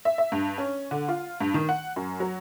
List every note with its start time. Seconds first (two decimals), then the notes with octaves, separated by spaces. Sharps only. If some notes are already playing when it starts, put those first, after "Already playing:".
0.05 E5
0.18 E5
0.32 G2
0.58 C#4
0.91 D3
1.08 F4
1.41 G2
1.54 D#3
1.69 F#5
1.96 F#2
2.20 F#3